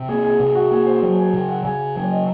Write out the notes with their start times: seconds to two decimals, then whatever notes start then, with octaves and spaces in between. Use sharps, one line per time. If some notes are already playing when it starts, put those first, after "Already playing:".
Already playing: C3
0.09 A#3 G#4
0.24 G#4
0.40 C3 G#4
0.55 F#4
0.71 A#3 G#4
0.86 C5
1.03 F#3 C#5
1.18 G#5
1.33 C#3 G#5
1.48 F#5
1.65 C#3 G#5
1.80 G#5
1.95 F#3 G#5
2.04 C#5
2.11 D#5